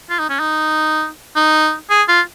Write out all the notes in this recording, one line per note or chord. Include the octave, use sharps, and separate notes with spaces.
F4
D#4
C#4
D#4
D#4
G#4
F4